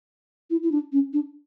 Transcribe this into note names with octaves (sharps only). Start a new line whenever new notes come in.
E4
E4
D4
C#4
D4